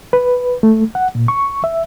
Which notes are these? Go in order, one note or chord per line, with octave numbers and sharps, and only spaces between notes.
B4
A3
F#5
A#2
C#6
E5